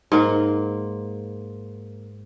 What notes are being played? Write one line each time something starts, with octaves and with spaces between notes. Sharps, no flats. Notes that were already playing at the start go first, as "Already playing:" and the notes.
G#2 A#3